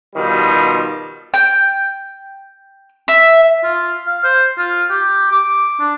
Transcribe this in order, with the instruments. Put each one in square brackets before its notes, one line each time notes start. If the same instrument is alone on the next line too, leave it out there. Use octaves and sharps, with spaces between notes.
[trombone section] B2 D#3 F3 G3
[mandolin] G5
E5
[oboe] F4
F5
C5
F4
G4
D6
D4